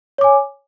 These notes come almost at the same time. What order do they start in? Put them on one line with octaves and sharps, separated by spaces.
C#5 D6 G#5